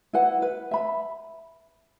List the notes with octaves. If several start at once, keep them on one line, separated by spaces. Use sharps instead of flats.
E4 B4 F#5
B4
E5 B5